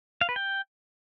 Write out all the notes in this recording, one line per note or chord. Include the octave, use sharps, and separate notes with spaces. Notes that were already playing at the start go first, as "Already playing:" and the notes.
F5
B4
G5